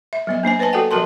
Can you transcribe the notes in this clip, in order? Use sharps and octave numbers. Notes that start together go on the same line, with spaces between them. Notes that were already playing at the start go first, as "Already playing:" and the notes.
E5
F#3 B3 D#5
A#3 D4 C5 G#5
B4 C5 D#5 G#5 A5
F#4 A4 D5 F#5 G5
F3 F#3 F#4 A#4 A5 C6